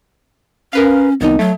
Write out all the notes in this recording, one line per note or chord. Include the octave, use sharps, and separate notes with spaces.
C#4 A#4 B4 F5
C2 D#3 B3 D#4
F#3 A3